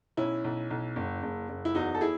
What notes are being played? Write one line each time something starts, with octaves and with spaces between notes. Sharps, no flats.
B1 C#4 E4
B1
B1
F#1
F#1
F#1
E4
E2 D#4 F#4
A4
E4 G#4